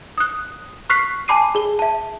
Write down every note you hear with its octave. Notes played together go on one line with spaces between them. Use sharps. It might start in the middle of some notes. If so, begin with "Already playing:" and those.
D#6 F#6
C#6 F6 F#6 B6 C7
G#5 A5 B5 D6 C7 D#7
G#4 G7
E5 A5